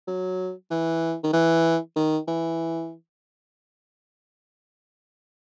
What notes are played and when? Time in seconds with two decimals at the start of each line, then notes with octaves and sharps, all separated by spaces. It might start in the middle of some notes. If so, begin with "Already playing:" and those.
0.07 F#3
0.70 E3
1.23 D#3
1.33 E3
1.96 D#3
2.28 E3